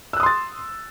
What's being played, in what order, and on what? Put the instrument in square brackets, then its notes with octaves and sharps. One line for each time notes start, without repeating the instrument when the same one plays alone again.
[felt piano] E6
F#6
D#6
C6
A6